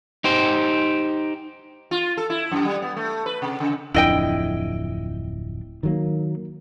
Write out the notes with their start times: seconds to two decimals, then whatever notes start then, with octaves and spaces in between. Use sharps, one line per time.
0.24 D#4 G4 C5
1.91 F4
2.17 A4
2.30 E4
2.52 F#2
2.65 G3
2.82 B3
2.97 A3
3.26 B4
3.42 C3
3.60 C#3
3.94 D1 F2 D4 E4 D#5 G5
5.83 D#3 F#3 A#3